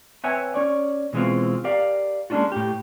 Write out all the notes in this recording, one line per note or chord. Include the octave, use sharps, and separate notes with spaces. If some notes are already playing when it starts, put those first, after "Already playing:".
C4 B4 C#5 E5 F#5 G#5
C#4 C#5 D5
B2 E3 G#3 A3 C4 F4
G4 A#4 D5 F5
G#3 A#3 C#4 D4 F4 F#4
A2 G4